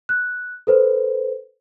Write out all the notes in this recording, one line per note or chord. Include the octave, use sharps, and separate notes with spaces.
F#6
A4 B4 C5